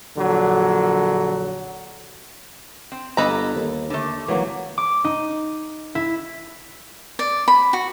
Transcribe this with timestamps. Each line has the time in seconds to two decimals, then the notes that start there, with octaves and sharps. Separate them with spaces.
0.17 A#1 D3 F#3
2.92 C4
3.17 G1 A#3 A4 B4 D#5 A#5
3.55 D#2
3.90 D#2 D3 A3
4.28 G#1 E3 F#3 A#3
4.78 D6
5.05 D#4
5.95 E4
7.19 D5
7.48 B5
7.73 F#4